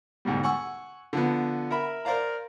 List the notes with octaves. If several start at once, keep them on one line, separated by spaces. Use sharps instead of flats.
D2 G#2 B2 G3
F#5 G#5 C#6 E6
D3 F3 B3
A#4 E5 B5
A#4 C5 D5 F5 A#5